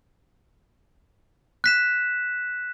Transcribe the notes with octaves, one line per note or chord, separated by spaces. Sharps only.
F#6 B6 E7